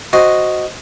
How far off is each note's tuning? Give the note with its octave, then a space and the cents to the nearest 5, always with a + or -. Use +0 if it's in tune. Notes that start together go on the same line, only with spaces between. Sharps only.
F#4 +0 C5 +0 D#5 +0